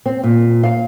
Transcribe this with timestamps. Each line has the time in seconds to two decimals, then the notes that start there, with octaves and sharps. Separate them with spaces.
0.06 C4
0.24 A#2
0.63 F5